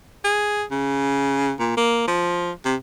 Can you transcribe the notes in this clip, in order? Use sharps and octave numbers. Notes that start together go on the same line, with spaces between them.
G#4
C#3
A#2
A#3
F3
C3